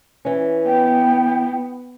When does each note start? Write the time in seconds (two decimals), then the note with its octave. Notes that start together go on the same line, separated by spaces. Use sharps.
0.25 E3 C#4
0.66 B3 G5